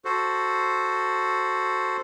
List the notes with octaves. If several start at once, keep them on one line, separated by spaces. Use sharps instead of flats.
F#4 A4 C5